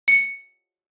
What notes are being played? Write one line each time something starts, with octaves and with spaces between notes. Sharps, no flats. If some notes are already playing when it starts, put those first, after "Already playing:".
C#7